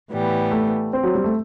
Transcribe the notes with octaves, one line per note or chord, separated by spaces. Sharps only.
A2 E3 G3 B3
A3
C4
F#3
G3
A3